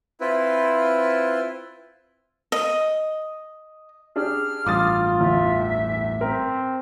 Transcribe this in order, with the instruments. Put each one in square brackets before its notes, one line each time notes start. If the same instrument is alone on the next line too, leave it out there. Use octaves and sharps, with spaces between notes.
[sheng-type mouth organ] C4 E4 F4 B4
[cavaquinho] D#5
[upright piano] D4 G4 G#4 [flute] F6
[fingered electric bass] A1 G2 [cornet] F4 [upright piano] D6 D#6 A6
[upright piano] E2 [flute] E5
[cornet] C4 [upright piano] A#4